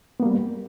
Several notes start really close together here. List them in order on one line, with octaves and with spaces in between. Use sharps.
B3 A#3 G3